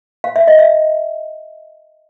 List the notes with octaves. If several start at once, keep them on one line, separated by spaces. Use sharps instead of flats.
F5
E5
D#5
E5